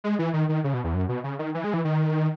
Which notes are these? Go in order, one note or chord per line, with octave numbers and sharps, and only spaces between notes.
G#3
E3
D#3
D#3
C#3
B2
E2
F#2
B2
C#3
D#3
E3
G#3
E3
D#3